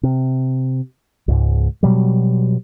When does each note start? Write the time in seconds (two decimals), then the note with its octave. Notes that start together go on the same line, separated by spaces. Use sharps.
0.03 C3
1.28 C#2 G#2
1.83 B2 F#3 G3